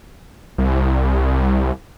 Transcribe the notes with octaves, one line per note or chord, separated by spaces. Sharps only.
C2